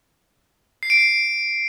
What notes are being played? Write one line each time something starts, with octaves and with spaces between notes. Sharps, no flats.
C7
D7
C7